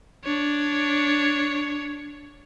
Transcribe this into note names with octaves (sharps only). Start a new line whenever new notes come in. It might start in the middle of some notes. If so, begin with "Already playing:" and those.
D4 C#5